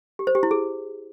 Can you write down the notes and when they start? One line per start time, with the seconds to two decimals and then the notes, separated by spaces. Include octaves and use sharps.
0.19 G4
0.27 C5
0.35 G4
0.43 E4
0.51 G#4